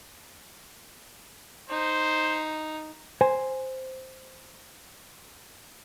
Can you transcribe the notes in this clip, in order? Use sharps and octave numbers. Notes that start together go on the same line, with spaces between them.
D#4 C5
C5 G#5